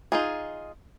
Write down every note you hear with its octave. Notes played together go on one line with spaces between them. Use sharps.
D#4 F4 G#4